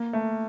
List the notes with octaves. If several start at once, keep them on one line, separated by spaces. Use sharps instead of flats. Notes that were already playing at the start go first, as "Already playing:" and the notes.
Already playing: A#3
A3